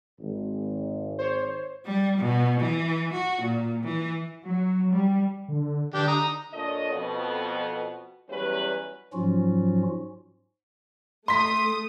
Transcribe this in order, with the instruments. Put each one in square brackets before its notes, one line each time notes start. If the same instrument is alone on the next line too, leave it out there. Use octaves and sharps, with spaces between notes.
[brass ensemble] G#1
[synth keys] C5 C#5
[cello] G3
B2
E3
F#4
A#2
E3
[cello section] F#3
G3
[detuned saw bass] D3
[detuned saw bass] D3 [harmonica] D4 G4
[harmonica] A#5 D#6
[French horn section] A#2 A3 D4 C#5 D#5
F2 B2 B3
E2 F#3 G3 C#4 B4
[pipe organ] G#2 F3 F#3 C#4 F4 F#4
[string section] A3 D#6 [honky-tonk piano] C6 B6